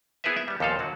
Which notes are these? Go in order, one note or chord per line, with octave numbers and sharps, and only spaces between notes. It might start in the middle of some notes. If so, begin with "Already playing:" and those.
B3 E4 G#4 A#4 B4 E5
E5
G3 B3
D#2 A#2 F3 A4 D#5 F5
D3 F#3 F#4